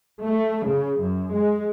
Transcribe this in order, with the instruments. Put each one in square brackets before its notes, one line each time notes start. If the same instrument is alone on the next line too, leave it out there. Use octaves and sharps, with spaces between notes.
[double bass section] A3
C#3
F#2
G#3